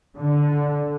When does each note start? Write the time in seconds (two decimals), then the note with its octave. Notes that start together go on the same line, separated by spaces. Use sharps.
0.18 D3